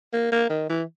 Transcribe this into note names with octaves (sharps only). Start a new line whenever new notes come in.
A#3
A#3
D#3
E3